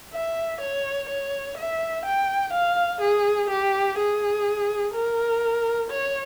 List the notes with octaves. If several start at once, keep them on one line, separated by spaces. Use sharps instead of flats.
E5
C#5
C#5
E5
G5
F5
G#4
G4
G#4
A#4
C#5